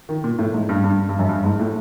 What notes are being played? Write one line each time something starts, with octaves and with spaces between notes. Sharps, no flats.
D#3
A#2
A2
G#2
G2
G2
G2
F#2
G2
G#2
A2